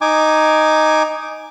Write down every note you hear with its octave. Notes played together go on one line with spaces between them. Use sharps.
D#4 G#5 D6